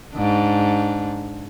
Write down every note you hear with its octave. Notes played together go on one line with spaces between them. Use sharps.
G#2 D4